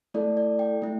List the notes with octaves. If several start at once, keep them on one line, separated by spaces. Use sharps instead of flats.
A3 E4 A4 D5
D5
G5
A3 E4